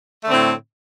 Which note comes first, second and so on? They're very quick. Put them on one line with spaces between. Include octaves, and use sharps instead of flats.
A3 D3 C4 A2